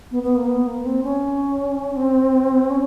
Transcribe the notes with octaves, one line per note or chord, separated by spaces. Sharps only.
B3
B3
A#3
B3
A#3
C4
C#4
C4
C#4